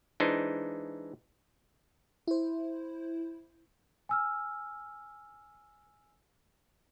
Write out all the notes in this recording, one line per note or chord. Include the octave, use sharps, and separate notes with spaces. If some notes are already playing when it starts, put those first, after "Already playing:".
E3 G#3 D4 D#4 C5
E4 C5
G#5 E6 F6